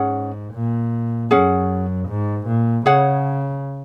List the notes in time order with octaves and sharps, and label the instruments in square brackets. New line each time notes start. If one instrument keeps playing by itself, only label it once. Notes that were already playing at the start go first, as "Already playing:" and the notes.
Already playing: [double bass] G#2 [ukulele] C#4 G#4 F#5
[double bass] A#2
[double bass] F#2 [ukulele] C#4 G#4 F#5
[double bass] G#2
A#2
[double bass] C#3 [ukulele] G#4 C#5 F#5